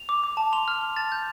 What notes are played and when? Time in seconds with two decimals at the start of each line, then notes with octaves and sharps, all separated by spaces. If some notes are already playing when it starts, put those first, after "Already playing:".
Already playing: F7
0.09 D6
0.24 D6
0.37 A5
0.52 C6 F7
0.68 F6
0.82 F6
0.96 A5 A6
1.12 G6